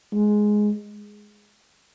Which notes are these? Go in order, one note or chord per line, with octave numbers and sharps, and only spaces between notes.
G#3